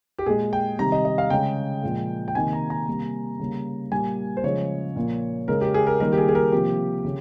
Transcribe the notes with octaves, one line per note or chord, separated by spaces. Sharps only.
G4
A#2 G#3 G#4
G5
C3 D#3 G3 A#5
D#5
D#5
F5
C#3 G#3 G5
A#2 F3 G#3
G5
C3 D#3 A#3 G#5
A#5
A#5
C3 G3 A#3
C#3 G3 A#3
A#2 G3 A#3 G#5
C5
C#3 F3 G#3 C#5
A#2 F3 A#3
C#3 G#3 A#4
G4
G#4
A#4
D#3 G3 A#3 A#4
G4
G#4
G#4
A#4
C3 F3 A#3 G4
C#3